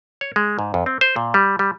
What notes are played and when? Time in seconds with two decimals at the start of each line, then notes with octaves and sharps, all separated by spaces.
0.21 C#5
0.36 G#3
0.59 G#2
0.74 F2
0.86 C4
1.01 C5
1.16 A#2
1.34 G3
1.59 G3